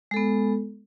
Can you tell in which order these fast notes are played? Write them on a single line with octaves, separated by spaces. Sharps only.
G#3 A4 B3